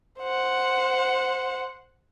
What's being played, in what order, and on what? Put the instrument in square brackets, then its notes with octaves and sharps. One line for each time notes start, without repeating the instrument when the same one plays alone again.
[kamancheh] C5 F#5